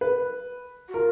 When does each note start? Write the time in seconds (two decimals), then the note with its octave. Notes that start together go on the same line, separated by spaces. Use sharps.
0.01 B4
0.88 F#4
0.94 F4 A#4